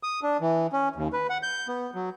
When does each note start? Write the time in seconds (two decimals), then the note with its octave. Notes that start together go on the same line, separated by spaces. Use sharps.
0.03 D#6
0.23 D4
0.41 E3
0.73 C#4
0.96 D#2
1.13 B4
1.30 F#5
1.43 G6
1.68 B3
1.95 F#3